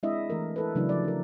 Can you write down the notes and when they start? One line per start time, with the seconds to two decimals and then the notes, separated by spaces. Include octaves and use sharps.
0.03 G#3 C4 D4 E4 D#5 E5
0.30 E3 A3 A#4
0.56 E4 A4 B4
0.75 C#3 E3 F#3 A3 D4 E4
0.89 F3 D5
1.04 D4 A#4